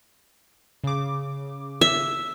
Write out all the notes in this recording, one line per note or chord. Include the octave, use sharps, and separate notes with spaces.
C#3 D6
E5